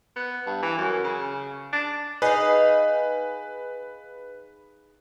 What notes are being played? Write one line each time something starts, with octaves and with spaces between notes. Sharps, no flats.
B3
G2
E3
F#2
C#3
D4
D#4 G#4 B4 F5